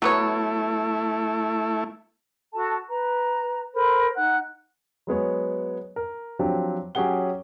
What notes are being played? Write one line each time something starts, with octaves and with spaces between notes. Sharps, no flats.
F#3 A3 B3 E4 C#5
F#4 A4 A5
B4 A#5
A4 A#4 C5 B5
D#4 F#5 F#6
F#3 G#3 B3 C#5
A#4
F3 F#3 C4 D4 G4
F#3 C#4 G4 G#4 F#5 G7